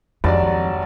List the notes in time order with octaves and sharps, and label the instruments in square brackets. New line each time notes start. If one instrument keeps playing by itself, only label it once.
[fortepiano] G#1 D4 D5 [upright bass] F2 [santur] F#3 G3 A5